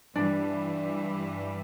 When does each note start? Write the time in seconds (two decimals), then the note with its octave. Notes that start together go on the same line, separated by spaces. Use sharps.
0.15 G2 E3 G3 D4